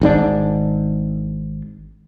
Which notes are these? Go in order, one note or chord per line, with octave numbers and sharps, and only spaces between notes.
G#1 G#2 D4